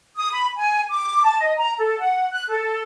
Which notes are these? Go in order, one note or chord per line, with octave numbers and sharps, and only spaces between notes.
D#6
B5
G#5
D6
A5
D#5
A#5
A4
F#5
F#6
A4